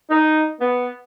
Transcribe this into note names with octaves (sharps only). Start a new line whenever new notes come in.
D#4
B3